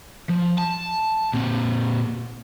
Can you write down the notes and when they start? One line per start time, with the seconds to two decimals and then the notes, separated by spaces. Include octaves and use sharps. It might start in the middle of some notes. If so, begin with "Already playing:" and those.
0.29 F3
0.58 A5
1.34 A#2 C4